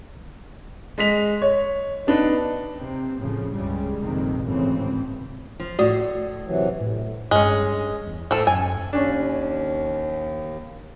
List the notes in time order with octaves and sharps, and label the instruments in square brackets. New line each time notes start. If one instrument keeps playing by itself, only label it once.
[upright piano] G#3 D#5 B6 F7
C#5
B3 D4 D#4 B4
[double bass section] C3 C4
A2 C#3 F3
C#2 G2 C#3 G3 G#3
A#1 F2 C3 D#3
G#1 A2 C#3 E3 C4
[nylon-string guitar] F3
[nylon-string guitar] A2 [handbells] F#4 D5 D#6
[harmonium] C3 E3 F#3
[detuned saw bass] A2
[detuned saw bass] G2 [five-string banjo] G#3 C#4
[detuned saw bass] E2
[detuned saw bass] A2 [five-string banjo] F3 A4
[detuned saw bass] F#2 [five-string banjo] G#5
[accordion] D#2 [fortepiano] C#4 D4